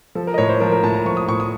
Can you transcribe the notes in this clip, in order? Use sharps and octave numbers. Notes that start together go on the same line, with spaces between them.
F3 A4
A#4
D#5
A2 C#5
C5
F3 A#4
A#4
A2 A5
A#5
F3 C#6
D#6
A2 C#6
D#6